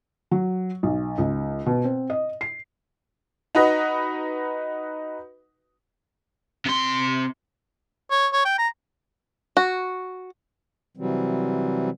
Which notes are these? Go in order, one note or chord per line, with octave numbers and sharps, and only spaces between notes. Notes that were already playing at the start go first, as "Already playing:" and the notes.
F#3
B1
C#2
B2
C4
D#5
C7
D#4 F#4 B4 D#5
C3 C6
C#5
C#5
G5
A#5
F#4
C3 E3 F#3 G3 C4